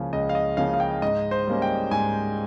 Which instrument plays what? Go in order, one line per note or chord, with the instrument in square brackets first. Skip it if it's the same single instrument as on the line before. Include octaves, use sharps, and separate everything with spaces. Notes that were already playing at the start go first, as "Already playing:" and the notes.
Already playing: [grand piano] C#2 C#3 F3 A#3 C#4
C#2 D#5
F5
D#5
C#3 F3 A#3 C#4 F5
F5
G5
G#2 D#5
C5
G3 A#3 C#4
G5
G#2 G#5